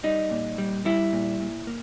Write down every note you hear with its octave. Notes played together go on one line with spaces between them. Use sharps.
G3 D#4
A#2
G3
G3 E4
A#2
A#2
A#3